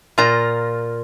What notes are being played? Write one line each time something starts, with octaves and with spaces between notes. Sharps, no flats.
A#2 F4 A#5